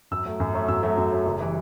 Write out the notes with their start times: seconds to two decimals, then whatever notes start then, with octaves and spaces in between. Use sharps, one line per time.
0.11 F#2 E6
0.25 F#3 A3
0.40 F#2
0.54 F#3 A3
0.68 F#2 E6
0.83 F#3 A3
0.97 F#2
1.12 F#3 A3
1.26 F#1
1.40 E3 G3